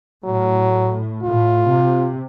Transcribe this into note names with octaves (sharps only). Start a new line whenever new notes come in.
A2 F#3
A2 F4
C3